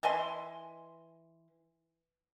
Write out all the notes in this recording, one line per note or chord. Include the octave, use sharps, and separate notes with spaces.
E3 D#5 G#5 C6